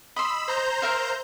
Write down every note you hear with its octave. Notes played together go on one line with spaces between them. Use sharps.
D#5 B5 C6 E6
C5 A#5 G6
A#4 E5 F5